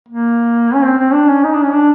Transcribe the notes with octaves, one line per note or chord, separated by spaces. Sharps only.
A#3
C#4
C4
C4
D4
C#4
D#4
D4
C#4
D4